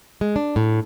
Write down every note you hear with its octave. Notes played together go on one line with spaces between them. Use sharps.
G#3
D4
A2